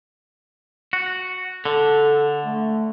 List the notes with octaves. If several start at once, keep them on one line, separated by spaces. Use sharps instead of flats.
F#4
D3 A4
A3